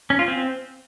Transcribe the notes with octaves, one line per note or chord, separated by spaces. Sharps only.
C#4
F4
C4